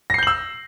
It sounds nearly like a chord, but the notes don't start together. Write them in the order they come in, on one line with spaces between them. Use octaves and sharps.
A#6 C7 G6 F#7 E6